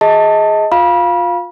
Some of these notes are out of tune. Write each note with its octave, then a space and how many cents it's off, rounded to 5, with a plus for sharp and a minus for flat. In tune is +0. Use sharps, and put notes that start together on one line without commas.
G#4 +5 D#5 +25 A5 +15
F4 +25 F5 +0 B5 -30